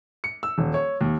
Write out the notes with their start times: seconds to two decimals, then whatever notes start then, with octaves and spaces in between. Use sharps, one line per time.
0.24 C#7
0.43 E6
0.58 D#1
0.74 C#5
1.01 D#2